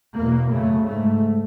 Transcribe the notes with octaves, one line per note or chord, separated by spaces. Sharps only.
E2 B2 A#3
F#2 C#3 A3
G#2 A3